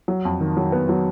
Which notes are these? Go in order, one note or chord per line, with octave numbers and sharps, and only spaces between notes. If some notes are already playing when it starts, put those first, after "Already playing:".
F#3
F2
D#3
F#3
B3
F#3